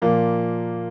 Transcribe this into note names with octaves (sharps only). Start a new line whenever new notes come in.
A#2 F3 A#3